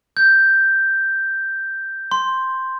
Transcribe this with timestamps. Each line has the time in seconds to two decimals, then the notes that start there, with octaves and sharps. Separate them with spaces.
0.17 G6
2.11 C6